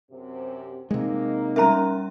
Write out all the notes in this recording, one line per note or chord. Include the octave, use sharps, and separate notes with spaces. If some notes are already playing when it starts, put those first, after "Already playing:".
F#2 C3
C3 G#3 A#3 D#4
G3 C#4 A#4 E5 A#5